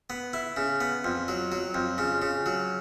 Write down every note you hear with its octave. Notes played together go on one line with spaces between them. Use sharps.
B3
E4
C#3
B3
F2
F#3
F#3
F2
C#3
C#3
F#3